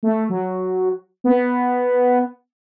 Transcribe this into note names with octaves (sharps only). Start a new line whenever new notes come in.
A3
F#3
B3